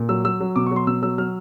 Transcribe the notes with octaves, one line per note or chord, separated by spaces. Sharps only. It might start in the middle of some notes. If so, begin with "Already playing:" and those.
Already playing: A#2
F#3 E6
F#3 E6
F#3
B2 D6
C#6
F#3 C6
B2 E6
F#3 E6
F#3 F6